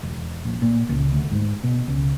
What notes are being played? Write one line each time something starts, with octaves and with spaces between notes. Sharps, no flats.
E1
A#1
A#2
C#2
D2
G#2
B2
C#2